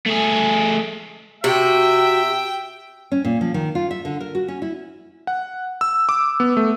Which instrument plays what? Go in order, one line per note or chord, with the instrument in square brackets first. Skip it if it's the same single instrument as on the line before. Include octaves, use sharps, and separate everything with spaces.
[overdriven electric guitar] A3 G#4
[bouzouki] C3 [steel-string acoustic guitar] F#4 [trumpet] E5 [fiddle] G5
[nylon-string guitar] C#4
A#2
F3
D#3
F4
E5
D3
A#4
F#4
C#4
E4
[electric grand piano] F#5
E6
D6
B3
A3